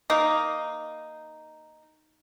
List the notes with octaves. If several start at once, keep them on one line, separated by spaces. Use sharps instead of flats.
A#3 D#4